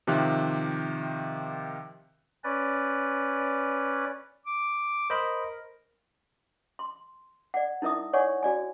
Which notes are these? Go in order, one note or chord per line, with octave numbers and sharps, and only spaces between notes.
C3 D#3 F3 G4 E5 F#6
C#4 B4 D5
D6
A#4 C5 D#5 B5
C6
D5 F#5
D#4 E4 A#4 E5 D#6
C#5 D5 F#5 G#5 C#6
F#4 D5 G#5